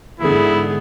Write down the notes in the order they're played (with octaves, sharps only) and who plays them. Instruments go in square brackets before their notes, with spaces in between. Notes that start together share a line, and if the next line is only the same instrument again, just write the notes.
[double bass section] G#2 D3 E3 [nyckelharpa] B3 G#4 [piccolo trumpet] E4